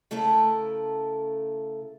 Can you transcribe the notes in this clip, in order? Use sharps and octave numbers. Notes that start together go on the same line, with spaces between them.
C#3 A3 E4 A4 A#4